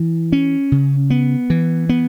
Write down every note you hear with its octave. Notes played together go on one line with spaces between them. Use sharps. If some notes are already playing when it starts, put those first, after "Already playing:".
Already playing: E3
C#4
C#3
B3
E3
B3